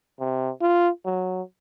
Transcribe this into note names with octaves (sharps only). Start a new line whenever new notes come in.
C3
F4
F#3